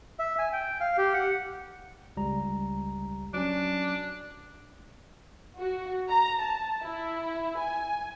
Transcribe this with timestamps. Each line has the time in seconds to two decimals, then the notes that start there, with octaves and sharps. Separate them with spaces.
0.19 E5
0.39 G#5
0.53 G5
0.81 F5
0.98 G4
1.14 F#5
2.17 C#2 G3 A#5
3.34 F#3 C#4 D4
5.58 F#4
6.08 A#5
6.40 A5
6.82 E4
7.58 G#5